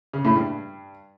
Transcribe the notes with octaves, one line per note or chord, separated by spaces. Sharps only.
C#3
A2
G2